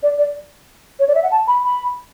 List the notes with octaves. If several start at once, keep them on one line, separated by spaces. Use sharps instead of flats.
D5
D5
C#5
D5
E5
F#5
A5
B5
B5